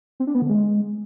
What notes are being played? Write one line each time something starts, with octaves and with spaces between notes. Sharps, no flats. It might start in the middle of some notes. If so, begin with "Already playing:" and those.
C4
D4
B3
D3
G#3